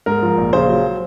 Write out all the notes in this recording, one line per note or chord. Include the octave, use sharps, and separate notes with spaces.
G#2 A#4
F3
A#1
C#3 C5
F#3